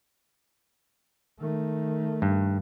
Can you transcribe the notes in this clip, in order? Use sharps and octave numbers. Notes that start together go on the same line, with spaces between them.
D#3 A3
G2